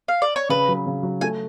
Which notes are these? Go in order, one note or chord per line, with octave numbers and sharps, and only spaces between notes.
F5
D5
C#5
C#3 B4
F#3
C#3
F#3
A3 G#5